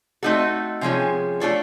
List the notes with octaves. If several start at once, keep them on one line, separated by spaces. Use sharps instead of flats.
A3 C4 D#4 F#4 A4
C3 F3 G#3 C#4
A3 D4 F4 A4 C#5